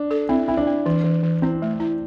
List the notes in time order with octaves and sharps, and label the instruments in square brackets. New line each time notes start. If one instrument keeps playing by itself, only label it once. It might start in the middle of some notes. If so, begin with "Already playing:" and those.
Already playing: [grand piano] D4
[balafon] A4
[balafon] C4 [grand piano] E4
[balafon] C4 [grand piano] E4
[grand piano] D4
[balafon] C4
E3
E3
E3
[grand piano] C4 [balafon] E4
[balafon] A3
E4